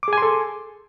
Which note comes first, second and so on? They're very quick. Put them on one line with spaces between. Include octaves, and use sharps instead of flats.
D6 G#4 G#5 C6 A4